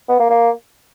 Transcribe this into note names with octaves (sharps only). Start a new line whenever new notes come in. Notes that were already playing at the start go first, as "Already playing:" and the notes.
B3
A#3
A#3